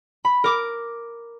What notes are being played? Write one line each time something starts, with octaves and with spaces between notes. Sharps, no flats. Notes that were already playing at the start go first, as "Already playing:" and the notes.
B5
A#4 D6